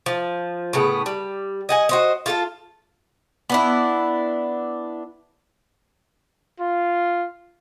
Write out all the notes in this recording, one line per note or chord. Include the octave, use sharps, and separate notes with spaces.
F3
A2 C#3 B3
G3
D#5 F#5 G#5
F#4 C5 D#5
F4 A4 F5
B3 D4 E4
F4